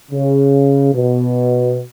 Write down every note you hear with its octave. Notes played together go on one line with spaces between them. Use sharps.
C#3
B2